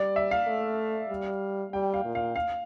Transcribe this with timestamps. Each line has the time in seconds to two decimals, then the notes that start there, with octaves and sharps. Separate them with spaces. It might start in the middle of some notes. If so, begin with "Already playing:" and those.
Already playing: G3 D5
0.16 E5
0.31 F5
0.47 A3
1.10 G3
1.72 G3 G5
1.94 F5
2.05 A#2
2.15 F5
2.36 F5